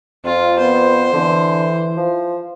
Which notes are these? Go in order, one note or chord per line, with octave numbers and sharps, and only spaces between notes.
F2 F4
B3 C5
D3 E3
F3